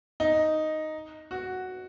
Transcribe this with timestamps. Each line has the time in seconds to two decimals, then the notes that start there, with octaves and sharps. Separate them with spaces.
0.20 D#4
1.31 F#4